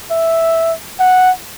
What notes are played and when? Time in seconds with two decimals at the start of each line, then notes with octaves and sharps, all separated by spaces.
0.11 E5
1.00 F#5